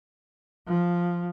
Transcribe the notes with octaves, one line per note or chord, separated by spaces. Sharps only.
F3